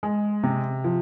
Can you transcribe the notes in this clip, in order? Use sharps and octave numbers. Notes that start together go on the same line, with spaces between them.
G#3
C3
F3